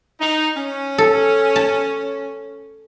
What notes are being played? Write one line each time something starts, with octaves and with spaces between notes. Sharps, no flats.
D#4
C#4
A4
A5